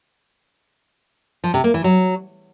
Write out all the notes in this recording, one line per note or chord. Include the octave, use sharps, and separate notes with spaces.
F3
C3
A#3
E3
F#3